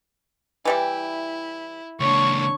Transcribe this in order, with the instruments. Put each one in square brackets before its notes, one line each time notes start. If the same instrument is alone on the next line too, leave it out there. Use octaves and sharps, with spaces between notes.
[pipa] E3 G3 G4 [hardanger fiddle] E4
[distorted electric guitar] C#2 A#3 [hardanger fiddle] D4 C#5 [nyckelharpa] C#6